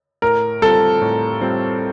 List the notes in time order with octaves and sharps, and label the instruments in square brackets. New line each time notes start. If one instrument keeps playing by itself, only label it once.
[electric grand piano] A2 [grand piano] A#4
[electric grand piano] G3 C4 F4 [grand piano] A4
[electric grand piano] A2
G3 C4 F4